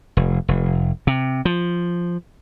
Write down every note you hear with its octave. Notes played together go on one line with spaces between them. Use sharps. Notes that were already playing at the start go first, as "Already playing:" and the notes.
F1
F1
C3
F3